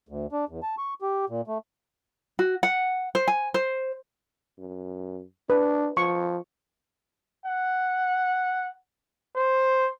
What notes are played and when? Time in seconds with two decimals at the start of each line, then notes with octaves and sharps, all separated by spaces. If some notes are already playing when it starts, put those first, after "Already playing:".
0.09 D2
0.32 D4
0.49 E2
0.63 A5
0.78 C#6
1.02 G4
1.29 A#2
1.48 A3
2.39 F#4
2.63 F#5
3.15 C5
3.28 G#5
3.54 C5
4.58 F#2
5.50 D4 B4
5.97 F3 C#6
7.46 F#5
9.36 C5